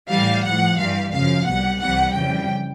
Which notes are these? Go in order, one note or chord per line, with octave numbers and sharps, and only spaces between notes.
A2 E3 G3 F5
A2 F3 F#5
G2 E3 G3 F5
F#2 C#3 F3 F5
C2 B2 G3 F#5
C2 C3 E3 G3 F#5
F2 C#3 E3 G3 G5